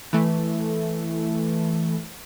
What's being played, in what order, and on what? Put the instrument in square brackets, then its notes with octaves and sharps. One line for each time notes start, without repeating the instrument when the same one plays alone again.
[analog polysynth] E3 A3